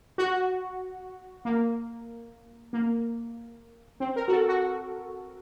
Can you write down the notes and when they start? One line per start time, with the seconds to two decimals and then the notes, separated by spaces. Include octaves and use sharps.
0.18 F#4
1.45 A#3
2.73 A#3
4.00 C4
4.16 A#4
4.28 F#4
4.32 A4
4.48 F#4